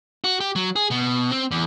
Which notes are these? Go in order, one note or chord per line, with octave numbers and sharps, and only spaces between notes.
F#4
G4
F#3
G#4
B2
C4
E2